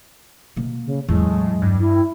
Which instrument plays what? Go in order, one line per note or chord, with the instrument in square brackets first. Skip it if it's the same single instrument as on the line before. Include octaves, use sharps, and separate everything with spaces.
[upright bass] B2 A#3
[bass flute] C#3
[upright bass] E2 F#3 [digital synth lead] A2 [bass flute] G#3
[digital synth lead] G2
[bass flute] E4